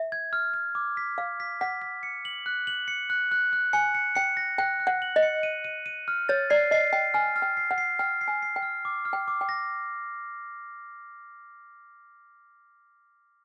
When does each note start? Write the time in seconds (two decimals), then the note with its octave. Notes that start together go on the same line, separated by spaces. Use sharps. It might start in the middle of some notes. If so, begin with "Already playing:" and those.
Already playing: E5
0.12 G#6
0.33 F6
0.54 F6
0.75 D6
0.97 B6
1.18 F5 B6
1.40 B6
1.61 F#5 B6
1.82 B6
2.03 C#7
2.25 F#7
2.46 F#6
2.67 F#7
2.88 C#7
3.10 F#6
3.32 F#6
3.53 F#6
3.73 G#5 C#7
3.95 C#7
4.15 G5 C#7
4.37 A#6
4.58 G5 F#6
4.80 F#6
4.87 F#5
5.02 F#7
5.16 D#5
5.23 C#7
5.43 D#7
5.64 D#7
5.86 D#7
6.08 F6
6.29 C#5 A6
6.50 D5 C7
6.71 D#5 C7
6.93 G5 C7
7.14 G#5 F6
7.36 F6
7.42 G5
7.57 C7
7.71 F#5
7.78 C7
7.99 G5 F6
8.21 C7
8.28 G#5
8.42 C7
8.56 G5
8.63 F6
8.85 D6
9.05 F6
9.13 G5
9.28 D6
9.41 G5
9.49 A#6